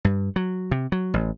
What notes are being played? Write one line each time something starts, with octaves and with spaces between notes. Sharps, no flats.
G2
F#3
C3
F#3
A1